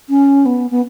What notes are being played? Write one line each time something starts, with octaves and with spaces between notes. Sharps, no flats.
C#4
B3
B3